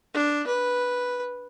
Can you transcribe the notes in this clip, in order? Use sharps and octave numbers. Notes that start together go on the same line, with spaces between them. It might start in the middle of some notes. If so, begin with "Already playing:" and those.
D4
B4